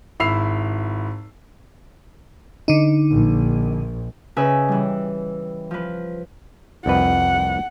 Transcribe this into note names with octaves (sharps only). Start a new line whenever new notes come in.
G#1 E4 B5 E6 C7 F7
D3 D#4
A#1
C#3 D#4 B4 E5 G#5
E3 G3
F3 B4
C2 F2 B4 F#5